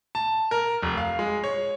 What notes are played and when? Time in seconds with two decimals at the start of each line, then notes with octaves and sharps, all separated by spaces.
0.15 A5
0.51 A#4
0.82 F1
0.97 F5
1.19 G#3
1.44 C#5